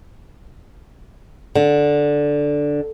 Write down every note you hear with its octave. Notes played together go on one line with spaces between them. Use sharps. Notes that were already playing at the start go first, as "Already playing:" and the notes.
D3